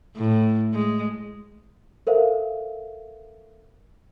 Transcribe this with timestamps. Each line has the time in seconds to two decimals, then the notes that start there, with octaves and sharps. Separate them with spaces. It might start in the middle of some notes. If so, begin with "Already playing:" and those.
0.17 A2
0.73 G#3
2.07 A4 A#4 C5 E5 F5